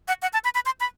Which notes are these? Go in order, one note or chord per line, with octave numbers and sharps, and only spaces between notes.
F#5
F#5
A5
B5
B5
C6
B5